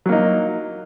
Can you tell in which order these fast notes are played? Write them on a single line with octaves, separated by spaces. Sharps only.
F#3 A#3 D#4